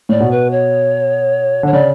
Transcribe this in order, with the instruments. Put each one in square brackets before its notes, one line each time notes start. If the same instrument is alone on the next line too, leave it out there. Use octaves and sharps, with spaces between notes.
[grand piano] A2 [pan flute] D5
[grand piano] B2
[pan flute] B4
C#5
[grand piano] D3 [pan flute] C#5
[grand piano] C#3 [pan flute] D5